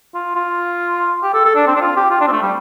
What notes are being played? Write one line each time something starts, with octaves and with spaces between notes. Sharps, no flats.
F4
F4
G4
A4
A4
D4
C4
D4
F4
G4
F4
D4
C4
A3
G3